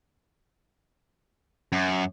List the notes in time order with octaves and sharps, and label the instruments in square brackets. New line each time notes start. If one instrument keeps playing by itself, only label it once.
[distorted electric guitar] F#2